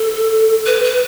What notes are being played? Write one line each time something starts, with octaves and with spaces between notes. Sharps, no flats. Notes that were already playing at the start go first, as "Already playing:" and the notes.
Already playing: A4
B4
B4